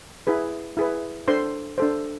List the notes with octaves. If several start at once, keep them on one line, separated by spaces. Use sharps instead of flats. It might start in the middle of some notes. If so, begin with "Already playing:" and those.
E4 G#4 B4
E4 G#4 B4
D4 A4 C5 C6
D4 A4 C5